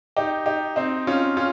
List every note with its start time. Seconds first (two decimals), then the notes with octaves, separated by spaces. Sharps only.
0.17 D#4 G4
0.46 D#4 G4
0.76 C4 D#4
1.07 C#4 F4
1.37 C#4 F4